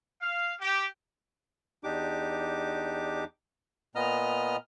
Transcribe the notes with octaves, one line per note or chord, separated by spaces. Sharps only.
F5
G4
E2 D4 D#4 G4 D6
A#2 B3 D#5 A#5 F6